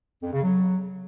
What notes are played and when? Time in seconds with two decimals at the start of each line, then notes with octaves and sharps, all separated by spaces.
0.23 F2
0.33 C#3
0.43 F#3